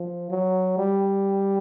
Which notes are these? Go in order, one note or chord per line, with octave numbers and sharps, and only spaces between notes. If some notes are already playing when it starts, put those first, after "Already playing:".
Already playing: F3
F#3
G3